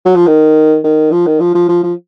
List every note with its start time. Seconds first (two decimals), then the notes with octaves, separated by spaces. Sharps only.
0.06 F#3
0.15 F3
0.27 D#3
0.84 D#3
1.11 F3
1.27 D#3
1.40 F3
1.55 F3
1.69 F3
1.83 F3